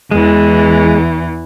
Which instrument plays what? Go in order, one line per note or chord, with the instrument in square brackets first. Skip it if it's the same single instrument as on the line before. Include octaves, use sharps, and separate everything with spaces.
[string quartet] E2 E3 [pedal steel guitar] G#3